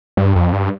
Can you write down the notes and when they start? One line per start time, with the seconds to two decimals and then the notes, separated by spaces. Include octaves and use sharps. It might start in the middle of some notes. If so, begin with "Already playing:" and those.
0.17 G2
0.35 F2
0.53 G2